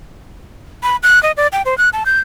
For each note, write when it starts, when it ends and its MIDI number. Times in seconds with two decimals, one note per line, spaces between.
0.83 0.96 83
1.03 1.22 90
1.23 1.32 75
1.37 1.47 74
1.52 1.62 79
1.65 1.77 72
1.78 1.89 90
1.93 2.04 81
2.06 2.20 91